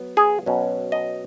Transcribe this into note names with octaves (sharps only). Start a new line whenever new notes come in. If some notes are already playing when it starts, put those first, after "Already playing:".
Already playing: F#3 B3
G#4
B2 F#3 C#4
D#5